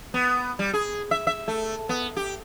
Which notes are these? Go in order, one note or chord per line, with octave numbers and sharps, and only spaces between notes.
B3
G3
G#4
E5
E5
A3
B3
G4